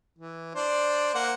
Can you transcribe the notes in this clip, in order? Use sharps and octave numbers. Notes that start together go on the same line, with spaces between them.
E3
D4 C5 D5
A#3 C5 F#5